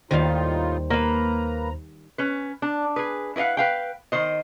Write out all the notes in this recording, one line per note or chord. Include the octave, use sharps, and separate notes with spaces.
D#2 A2 D#3 G3 D#4 F4 C5 F5
A#3 B4 A#5
C#4 B4
D4
G#4 B4
E4 B4 D#5 F5 F#5
B4 F5 G5
D#3 C5 D#5